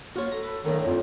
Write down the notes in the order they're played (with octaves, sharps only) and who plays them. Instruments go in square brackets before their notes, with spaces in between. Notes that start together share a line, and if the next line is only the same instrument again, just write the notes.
[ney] A#3 [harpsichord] F4 [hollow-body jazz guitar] F#4 C#5
[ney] A4 [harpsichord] A#5
[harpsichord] B4
[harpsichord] B1 A2 D3 [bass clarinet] D#3
[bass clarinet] F2 [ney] F4